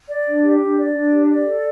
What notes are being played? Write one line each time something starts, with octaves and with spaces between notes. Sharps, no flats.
D5
D4
G4
D4
D5
D4
G4
D5
A4